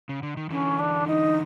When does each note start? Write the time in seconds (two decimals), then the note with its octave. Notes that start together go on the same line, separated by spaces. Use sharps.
0.09 C#3
0.23 D3
0.37 D#3
0.50 D3 E3 C#4
0.79 D4
1.07 D#4